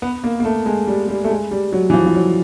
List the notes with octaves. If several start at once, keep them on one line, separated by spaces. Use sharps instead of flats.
B3
A#3
A#3
A3
G#3
G3
G3
A3
G#3
G3
F#3
E3
F3
F3
F#3